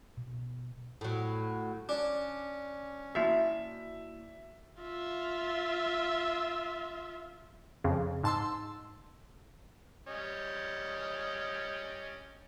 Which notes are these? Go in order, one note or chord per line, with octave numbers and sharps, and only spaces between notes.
B2
A2 F#3
C#4 D4
A#3 E4 F#4 E5
F4 E5
F2 C#3
G#2 A5 C6 E6
G3 C#4 D#5